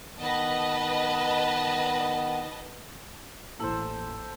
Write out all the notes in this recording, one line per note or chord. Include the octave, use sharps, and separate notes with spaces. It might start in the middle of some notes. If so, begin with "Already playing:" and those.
D#3 B3 B4 D#5 A5
A1 A#3 E4 A4 C5